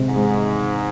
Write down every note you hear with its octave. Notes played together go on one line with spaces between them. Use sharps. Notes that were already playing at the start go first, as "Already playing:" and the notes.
Already playing: C3 G#3 C4
G#2
G#3